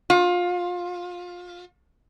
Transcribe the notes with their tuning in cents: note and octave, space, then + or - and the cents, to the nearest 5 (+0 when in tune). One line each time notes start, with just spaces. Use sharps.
F4 +25